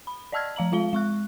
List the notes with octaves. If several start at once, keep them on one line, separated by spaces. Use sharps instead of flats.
B5
D5 D#5 A5 E6 F6 G#6
F3 F5 A#5 F#7
G#3 F4 F5 G7
G#3 C#6 F#6